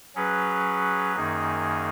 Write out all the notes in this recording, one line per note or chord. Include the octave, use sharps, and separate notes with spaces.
F#3 C#4 G#4 B4
F#2 D#3 A#3 D#4 G#4